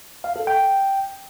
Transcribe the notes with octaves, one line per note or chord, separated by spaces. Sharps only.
F5
A4
G5